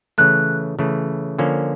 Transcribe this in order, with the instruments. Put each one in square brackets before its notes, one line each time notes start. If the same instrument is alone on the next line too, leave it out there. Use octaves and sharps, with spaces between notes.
[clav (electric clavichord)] C#3 E3 A3 [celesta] F#6
[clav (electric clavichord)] C#3 E3 A3
D3 F3 A#3 C#4